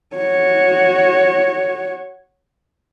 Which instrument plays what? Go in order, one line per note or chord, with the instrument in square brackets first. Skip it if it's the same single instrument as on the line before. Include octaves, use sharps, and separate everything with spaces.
[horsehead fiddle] F#4 C#5